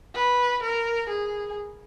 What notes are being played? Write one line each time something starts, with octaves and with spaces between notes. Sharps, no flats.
B4
A#4
G#4